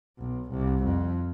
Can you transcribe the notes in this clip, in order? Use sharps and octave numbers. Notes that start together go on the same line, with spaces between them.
B1
C2
F2